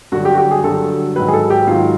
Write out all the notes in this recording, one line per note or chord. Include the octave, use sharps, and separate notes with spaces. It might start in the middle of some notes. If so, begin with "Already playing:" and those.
G2 D3 F#3 F#4
G4
F#4
G4
G#4
G2 D3 F#3 A4
G#2 D#3 F#3 B4
G#4
A4
G4
G#2 D#3 F#3 F4